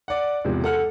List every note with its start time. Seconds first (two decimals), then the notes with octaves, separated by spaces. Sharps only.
0.08 D5 F#5
0.44 E2 G#2 C3 F3
0.64 A4 F#5 F6